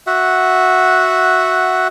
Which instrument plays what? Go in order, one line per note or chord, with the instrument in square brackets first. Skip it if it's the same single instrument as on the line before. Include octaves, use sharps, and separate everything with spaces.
[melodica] F#4 E5 F#5